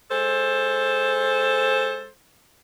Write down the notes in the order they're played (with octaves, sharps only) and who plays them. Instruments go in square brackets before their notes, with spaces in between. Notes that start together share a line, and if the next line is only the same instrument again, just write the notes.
[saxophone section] G#3 A4 C5